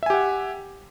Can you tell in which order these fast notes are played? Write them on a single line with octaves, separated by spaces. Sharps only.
E5 G#5 G4 F#5